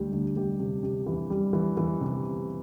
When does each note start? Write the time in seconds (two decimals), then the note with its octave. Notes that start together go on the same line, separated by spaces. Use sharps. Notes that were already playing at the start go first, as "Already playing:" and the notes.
Already playing: D2 G3 G4
0.12 D2
0.36 G3 G4
0.59 C3
0.83 C3
1.06 E3
1.30 G3
1.53 E3
1.77 E3
2.01 C3